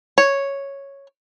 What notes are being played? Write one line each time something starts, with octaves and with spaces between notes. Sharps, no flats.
C#5